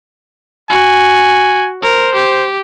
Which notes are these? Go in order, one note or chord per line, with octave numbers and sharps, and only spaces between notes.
F#4 G#5
A#4 C5
G4